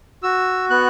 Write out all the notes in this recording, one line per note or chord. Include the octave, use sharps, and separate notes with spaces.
F#4 E6
B3 F#6